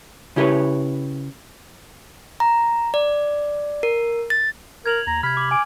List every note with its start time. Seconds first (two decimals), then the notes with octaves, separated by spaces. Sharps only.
0.36 C#3 E4 G4 A#4 B4 C#5
2.40 A#5
2.94 D5
3.83 A#4
4.30 A6
4.86 A#4 G#6 F7 F#7
5.07 D#2 A#5
5.23 C3 B5 F6 G#6
5.37 D6 F#7
5.51 G#5 D6